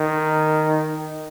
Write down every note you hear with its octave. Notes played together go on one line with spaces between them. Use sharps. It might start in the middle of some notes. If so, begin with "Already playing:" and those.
Already playing: D#3